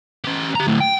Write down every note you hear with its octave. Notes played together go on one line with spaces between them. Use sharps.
C#4 G4
G4 A#5
D2 A2
G5